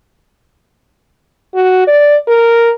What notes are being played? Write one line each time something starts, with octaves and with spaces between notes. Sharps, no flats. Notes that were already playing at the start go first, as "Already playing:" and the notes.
F#4
D5
A#4